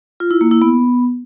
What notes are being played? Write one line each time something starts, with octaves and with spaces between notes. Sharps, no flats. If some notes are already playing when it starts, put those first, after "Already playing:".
F4
E4
A#3
E4
B3